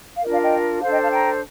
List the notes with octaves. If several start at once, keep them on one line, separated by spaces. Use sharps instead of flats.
F5
D4 F4 A#4 D#5
D5 F5
D#5 G5
D4 A4 C5 F5
D#5 G5
F5 A5
G5 A#5